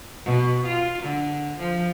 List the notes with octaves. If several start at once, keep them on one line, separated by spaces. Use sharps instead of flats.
B2
F4
D3
F3